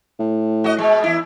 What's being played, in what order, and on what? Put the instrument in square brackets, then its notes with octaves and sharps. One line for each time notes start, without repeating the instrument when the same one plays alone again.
[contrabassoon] A2
[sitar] F#4 D#5
B2 G#3
E2 E4